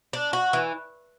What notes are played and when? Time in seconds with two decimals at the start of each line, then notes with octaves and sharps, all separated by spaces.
0.13 D4
0.33 F#4
0.53 E3